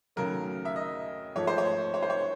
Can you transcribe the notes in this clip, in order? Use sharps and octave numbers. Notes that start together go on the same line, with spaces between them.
D#2 C#3 F#3 A3 A#4
E5
D#5
G#2 F3 A3 C#5
C5
C#5
C#5
C5
C#5